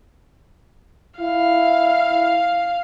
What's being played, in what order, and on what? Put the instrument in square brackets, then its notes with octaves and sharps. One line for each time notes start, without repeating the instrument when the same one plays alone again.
[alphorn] E4 [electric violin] F5